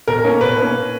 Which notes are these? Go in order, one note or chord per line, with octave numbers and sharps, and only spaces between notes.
B2 A#4
A#3 C#4
B2 B4
A#3 C#4